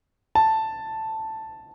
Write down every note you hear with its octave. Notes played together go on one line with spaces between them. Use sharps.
A5